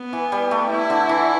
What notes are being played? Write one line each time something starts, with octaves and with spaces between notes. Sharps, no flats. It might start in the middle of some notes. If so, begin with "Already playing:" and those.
Already playing: B3
E3
G3
A3
E4
D3
E3